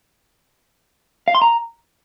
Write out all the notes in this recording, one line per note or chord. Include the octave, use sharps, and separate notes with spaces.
F5
C6
A#5